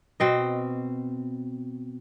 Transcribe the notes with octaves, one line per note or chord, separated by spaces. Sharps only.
B2 C4 D#5